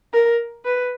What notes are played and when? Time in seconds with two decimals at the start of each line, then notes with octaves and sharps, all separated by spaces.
0.13 A#4
0.65 B4